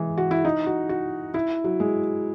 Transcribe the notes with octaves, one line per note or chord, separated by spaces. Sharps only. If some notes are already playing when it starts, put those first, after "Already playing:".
Already playing: E3 G#3
F#4
E4
D#4
F#4
F#4
E4
F#3
G#3